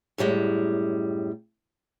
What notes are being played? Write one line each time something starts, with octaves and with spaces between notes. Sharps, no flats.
F#2 A2 G3 G#3